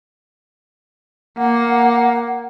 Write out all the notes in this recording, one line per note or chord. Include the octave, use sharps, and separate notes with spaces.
A#3 F#5